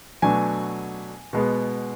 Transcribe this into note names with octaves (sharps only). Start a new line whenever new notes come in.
B2 F#3 A3 D4 G#5
B2 G#3 B3